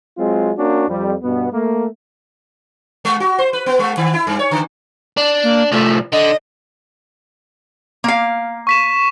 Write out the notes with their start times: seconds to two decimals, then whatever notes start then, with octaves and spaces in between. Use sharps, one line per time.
0.18 F#3 G#3 C4 F4
0.58 A#3 C#4 D4 F#4
0.88 F2 G3
1.23 G2 B2 B3
1.52 A3 A#3
3.05 G#3
3.20 F#4
3.38 C5
3.53 B4
3.66 B3
3.79 G#3
3.97 D#3
4.14 E4
4.27 G2
4.39 C#5
4.51 D3
5.17 D4
5.43 A#3
5.72 C2 F3 A3
6.13 D3 D#5
8.04 A#3 F5
8.67 C#6 B6 E7